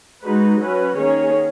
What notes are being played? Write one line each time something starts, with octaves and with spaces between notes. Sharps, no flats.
G#3 D#4 F#4 B4
F#3 C#4 F#4 B4
D#3 A#3 C#4 G#4 C#5